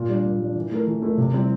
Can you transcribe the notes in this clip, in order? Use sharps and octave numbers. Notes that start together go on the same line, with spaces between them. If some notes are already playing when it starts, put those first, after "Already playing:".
Already playing: A#2
G3 D4
A#2
G3 D4
E3
A3 E4 A#4
E3
A3 E4 A#4
C3
G3 C4 E4